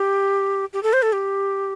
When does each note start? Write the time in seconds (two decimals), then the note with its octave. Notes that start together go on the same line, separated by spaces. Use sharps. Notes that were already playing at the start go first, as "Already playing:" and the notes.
Already playing: G4
0.73 G4
0.83 A4
0.93 C5
1.02 A4
1.13 G4